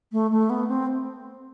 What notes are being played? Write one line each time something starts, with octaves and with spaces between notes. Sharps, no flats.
A3
A3
B3
C4